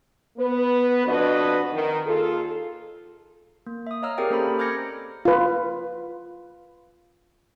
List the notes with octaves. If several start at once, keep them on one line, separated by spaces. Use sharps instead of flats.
B3 B4
F2 D4 F#4 B4 D#5
D#3
D#2 F4 G#4 A4
A#3
E5 D#6
C#5 D#5 F5 A#5 E6 F6
C4 G4 G#4 A#4 D5 G5
A#3 C#4 A4 C5 A#5 B5
D6 F6 G6 G#6 A#6 C#7
F4 B4